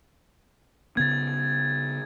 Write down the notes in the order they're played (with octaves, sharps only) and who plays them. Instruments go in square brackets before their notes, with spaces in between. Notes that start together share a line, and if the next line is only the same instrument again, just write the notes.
[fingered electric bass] C#3 B3 [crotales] G#6 A6